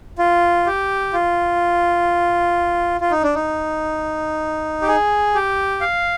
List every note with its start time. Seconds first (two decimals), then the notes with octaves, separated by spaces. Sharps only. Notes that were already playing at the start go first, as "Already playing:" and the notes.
0.18 F4
0.66 G4
1.13 F4
3.01 F4
3.11 D#4
3.23 D4
3.35 D#4
4.82 G4
4.88 G#4
5.35 G4
5.81 F5